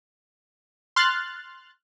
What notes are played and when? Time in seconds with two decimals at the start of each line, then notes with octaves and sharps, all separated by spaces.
0.96 C6 F6 F#6 A6